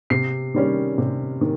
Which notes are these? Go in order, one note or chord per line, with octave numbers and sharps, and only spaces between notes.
C3 C7
D#3 G3 C#4
C3
D#3